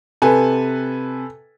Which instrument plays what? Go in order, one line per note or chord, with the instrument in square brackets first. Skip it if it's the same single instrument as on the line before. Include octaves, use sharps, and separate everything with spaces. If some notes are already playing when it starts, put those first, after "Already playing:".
[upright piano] C3 B4 G#5 [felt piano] A4